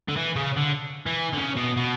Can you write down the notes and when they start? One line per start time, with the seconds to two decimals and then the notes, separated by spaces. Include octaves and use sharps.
0.09 D3
0.17 E3
0.36 C#3
0.57 D3
1.06 E3
1.33 D3
1.37 C#3
1.56 B2
1.77 B2